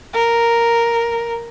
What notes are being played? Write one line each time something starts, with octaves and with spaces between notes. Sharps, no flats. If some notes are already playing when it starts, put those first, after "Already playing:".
A#4